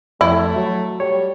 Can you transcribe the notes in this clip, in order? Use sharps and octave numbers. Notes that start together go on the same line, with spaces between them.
F2 A3 E4 G#6
F#3
G3 C#5